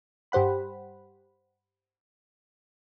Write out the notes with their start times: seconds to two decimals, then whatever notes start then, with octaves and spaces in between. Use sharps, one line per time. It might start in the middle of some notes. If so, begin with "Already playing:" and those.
0.32 G2 G4 C5 F#5 B5